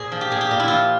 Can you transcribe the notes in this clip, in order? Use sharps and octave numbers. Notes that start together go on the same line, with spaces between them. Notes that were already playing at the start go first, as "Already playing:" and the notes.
Already playing: A#2 G#4 C5
F3
G4
A#2 G#4
G4
A#2 F4
E4
F3 F4